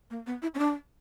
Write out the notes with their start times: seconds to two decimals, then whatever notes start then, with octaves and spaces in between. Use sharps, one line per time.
0.10 A#3
0.27 B3
0.42 E4
0.54 C#4
0.59 D4